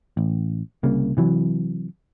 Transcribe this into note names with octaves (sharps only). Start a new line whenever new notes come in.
A1
C2 C#3 A#3
C3 E3 F#3